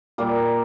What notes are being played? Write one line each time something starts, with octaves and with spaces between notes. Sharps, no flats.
A#2 G3 A#3